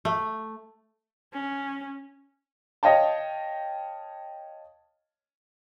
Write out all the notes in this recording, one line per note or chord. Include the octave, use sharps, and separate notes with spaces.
A3
C#4
C#5 D#5 F5 G5 A5